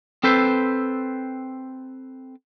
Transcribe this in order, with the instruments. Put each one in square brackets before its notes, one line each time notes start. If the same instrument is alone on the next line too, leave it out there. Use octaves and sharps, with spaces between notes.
[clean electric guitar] C4 A4 B4 C5